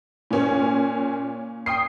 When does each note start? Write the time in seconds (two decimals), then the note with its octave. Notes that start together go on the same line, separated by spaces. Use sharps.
0.31 A#2 C#4
1.66 G5 D#6 C7